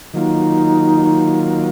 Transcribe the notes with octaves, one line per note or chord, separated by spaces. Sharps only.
D#3 F#3 A#3 D#4 F4